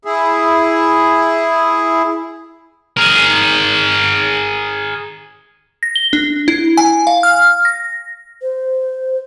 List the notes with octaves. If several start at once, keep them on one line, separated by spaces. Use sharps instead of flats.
E4 G#4
G#4 A#4
A#6
G7
D4
E4
G#5
F5
F6
A#6
C5